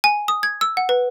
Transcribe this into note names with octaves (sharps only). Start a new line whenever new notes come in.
G#5
D#6
G#6
E6
F#5
B4